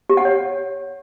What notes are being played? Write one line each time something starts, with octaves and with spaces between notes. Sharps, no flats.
G4
F#5
C#5